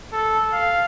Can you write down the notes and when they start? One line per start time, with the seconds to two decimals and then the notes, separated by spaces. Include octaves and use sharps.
0.13 A4
0.52 F5